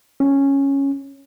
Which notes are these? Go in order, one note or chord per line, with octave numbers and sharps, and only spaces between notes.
C#4